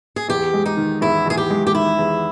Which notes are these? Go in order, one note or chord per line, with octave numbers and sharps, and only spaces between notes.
G#4
E2 G4
G#3
D#4
D#3
E2 E4
E2 G#4
G4
G#3
G4
D#3 E4
E2